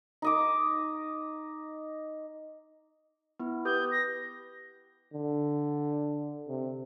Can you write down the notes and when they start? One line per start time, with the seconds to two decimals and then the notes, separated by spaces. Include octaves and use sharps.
0.22 D#4 D#5 D6
3.39 B3 E4
3.65 G4 B4 D#6 G6
3.91 A#6
5.13 D3
6.48 C3